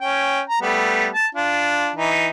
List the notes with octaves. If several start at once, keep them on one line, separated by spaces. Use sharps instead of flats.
C#4 G5
A#5
G3 A3 B3
A5
D4 F4
E3 D#4